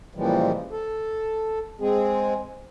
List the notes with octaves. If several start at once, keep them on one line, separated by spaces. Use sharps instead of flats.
A#2 C#3 E3 F3 G3 G#3
A4
G#3 C4 G#4